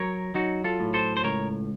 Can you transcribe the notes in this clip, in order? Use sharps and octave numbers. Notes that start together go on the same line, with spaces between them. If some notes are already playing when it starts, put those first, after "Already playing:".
Already playing: F#3 A#4 C#5
F#3 D#4 F#4
F4 A4
A2
A4 C5
C5
C#2 A#4 C#5